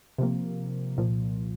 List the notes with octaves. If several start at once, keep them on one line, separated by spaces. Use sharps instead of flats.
C3 F3 A#3
C2 A#2 F3